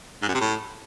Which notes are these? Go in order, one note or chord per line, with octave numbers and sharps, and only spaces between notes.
G#2
F#2
C3
A2